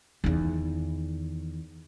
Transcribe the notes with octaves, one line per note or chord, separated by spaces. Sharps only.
E2 D#3